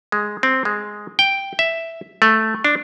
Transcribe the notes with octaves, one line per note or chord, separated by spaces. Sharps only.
G#3
C4
G#3
G5
E5
A3
D4